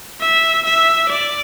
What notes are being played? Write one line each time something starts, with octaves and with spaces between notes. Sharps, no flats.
E5
E5
D5